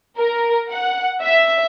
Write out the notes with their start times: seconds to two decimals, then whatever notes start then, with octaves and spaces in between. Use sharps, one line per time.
0.18 A#4
0.71 F#5
1.24 E5